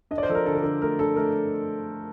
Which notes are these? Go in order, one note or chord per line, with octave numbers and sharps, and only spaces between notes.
D4 D#5
D5
C5
F3 A4
A#4
D3 A4
A#4
D3 A4
A3 A#4
D4 A4
A3 A#4